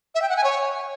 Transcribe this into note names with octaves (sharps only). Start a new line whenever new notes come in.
E5
G5
F#5
G#5
C#5